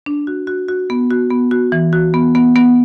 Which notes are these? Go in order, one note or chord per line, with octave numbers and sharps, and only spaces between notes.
D4
F#4
F#4
F#4
B3
F#4
B3
F#4
E3
F#4
B3
B3
B3